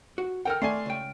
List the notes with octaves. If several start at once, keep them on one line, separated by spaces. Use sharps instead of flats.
F#4
A4 A#4 F#5 G5 F6
A3 D5 G#5 C6
C#2 G5